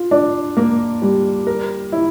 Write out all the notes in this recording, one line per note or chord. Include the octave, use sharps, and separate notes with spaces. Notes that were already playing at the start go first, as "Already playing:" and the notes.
Already playing: F4
D4
A#3
G3
A#4
E4